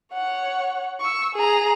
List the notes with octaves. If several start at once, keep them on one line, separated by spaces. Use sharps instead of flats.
C#5 F#5
C#6 E6
G#4 A#5